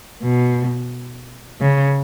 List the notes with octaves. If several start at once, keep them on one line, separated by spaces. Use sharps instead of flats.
B2
C#3